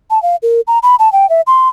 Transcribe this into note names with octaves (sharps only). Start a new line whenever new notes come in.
A5
F5
A#4
A#5
B5
A5
G5
E5
C6